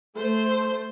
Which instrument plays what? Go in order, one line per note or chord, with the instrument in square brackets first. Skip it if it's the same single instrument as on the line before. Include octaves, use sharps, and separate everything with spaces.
[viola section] A3 C5